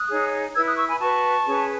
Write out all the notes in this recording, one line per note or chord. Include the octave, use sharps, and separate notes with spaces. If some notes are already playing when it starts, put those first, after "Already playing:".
Already playing: D#6 F#6
D#4 G#4 C#5
E4 B4 E6 G#6
D#6 F#6
C#6 E6
G#5 B5
F#4 B4 A5 C#6
C#4 G#4 B4